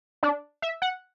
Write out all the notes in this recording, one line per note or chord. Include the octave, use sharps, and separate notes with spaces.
D4
E5
F#5